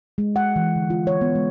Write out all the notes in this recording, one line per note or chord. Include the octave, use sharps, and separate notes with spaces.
G#3
F#5
E3
D3
F4
C#5
B3
G#3